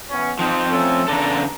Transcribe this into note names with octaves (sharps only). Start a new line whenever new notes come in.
E3 B3 C#4
F3 C4 D#4
A3 C#4 A4
E2 C#3 D4 A4 A#5